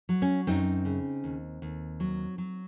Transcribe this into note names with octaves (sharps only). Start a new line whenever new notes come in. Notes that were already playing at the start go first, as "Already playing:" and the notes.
F#3
C#4
F#2 C4 D#4
C#3
D#2
D#2
F#3
F#3